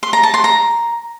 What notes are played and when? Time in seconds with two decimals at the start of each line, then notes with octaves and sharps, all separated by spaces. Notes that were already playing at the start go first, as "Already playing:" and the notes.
0.03 C6
0.13 A#5
0.23 A5
0.34 C6
0.44 A#5